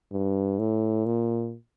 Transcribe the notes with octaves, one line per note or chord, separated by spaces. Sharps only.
G2
A2
A#2